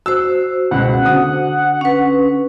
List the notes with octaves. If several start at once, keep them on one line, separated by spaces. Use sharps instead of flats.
F#4 C5 E6
C#2 B2 F#5
D3 D#6
C#4 B4